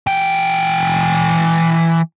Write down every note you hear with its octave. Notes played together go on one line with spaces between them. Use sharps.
E3 G5